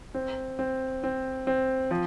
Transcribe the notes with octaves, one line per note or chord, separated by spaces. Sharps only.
C4
C4
C4
C4
F3